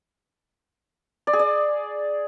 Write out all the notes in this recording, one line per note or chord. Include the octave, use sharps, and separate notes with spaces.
D5
G#4
D5